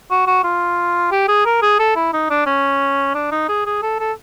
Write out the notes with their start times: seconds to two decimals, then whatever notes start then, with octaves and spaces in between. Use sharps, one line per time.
0.10 F#4
0.27 F#4
0.44 F4
1.11 G4
1.28 G#4
1.45 A#4
1.62 G#4
1.79 A4
1.96 E4
2.13 D#4
2.30 D4
2.46 C#4
3.14 D4
3.31 D#4
3.49 G#4
3.66 G#4
3.82 A4
3.99 A4